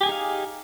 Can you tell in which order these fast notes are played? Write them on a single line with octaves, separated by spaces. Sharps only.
G4 G#5 G#4 D#4 F5